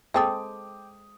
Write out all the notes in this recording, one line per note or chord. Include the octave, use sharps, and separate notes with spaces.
G#3 C4 A4 G5 D6 D#6